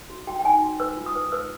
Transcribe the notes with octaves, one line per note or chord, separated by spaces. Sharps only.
F#4
F#4 G5
G5
D#4 G#5
F#4
B4 E6
F4
D#6
B4
B4 E6